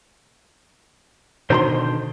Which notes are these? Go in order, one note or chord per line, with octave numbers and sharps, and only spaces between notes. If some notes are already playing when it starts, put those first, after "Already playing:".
B2 D3 D#3 C5 A#5 C6